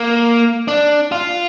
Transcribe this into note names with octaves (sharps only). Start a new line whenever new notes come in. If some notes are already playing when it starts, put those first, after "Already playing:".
Already playing: A#3
D4
F4